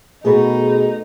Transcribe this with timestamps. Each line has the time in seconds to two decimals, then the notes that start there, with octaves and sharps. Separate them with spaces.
0.25 B2 A3 B3 D#4 F#4 G#4 B5